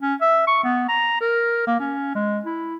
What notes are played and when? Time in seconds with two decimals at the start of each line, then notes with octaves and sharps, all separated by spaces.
0.01 C#4
0.21 E5
0.47 C#6
0.64 B3
0.88 A#5
1.21 A#4
1.67 A#3
1.79 C#4
2.15 G#3
2.45 E4